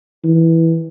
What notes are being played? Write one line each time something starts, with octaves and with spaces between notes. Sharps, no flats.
E3